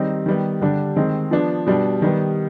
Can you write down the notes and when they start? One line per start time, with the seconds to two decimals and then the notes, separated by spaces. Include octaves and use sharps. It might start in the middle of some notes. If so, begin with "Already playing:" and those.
Already playing: D#3 G3 C4 D#4
0.26 D#3 G3 B3
0.61 D3 G3 D4
0.96 D#3 G#3 C4
1.31 F3 B3 D4
1.67 B2 G3 D4
2.02 D#3 G3 B3